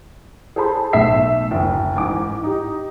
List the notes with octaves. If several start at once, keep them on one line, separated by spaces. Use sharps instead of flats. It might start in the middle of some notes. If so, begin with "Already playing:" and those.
G#4 A4 C5 A5 B5 C6
B1 A3 E5 C7
F#1 D2
A1 G#2 F#5 G#5 D6
D#4 G4